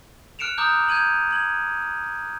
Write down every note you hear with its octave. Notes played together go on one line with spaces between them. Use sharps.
F6 F#6 C#7 D7 E7 F7
A#5 D6 D#6 F6 G6
G6 G#6 D#7 F#7
G#6 F#7